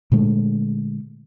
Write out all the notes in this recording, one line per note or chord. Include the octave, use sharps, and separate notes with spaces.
A#2 D3 G#3 A3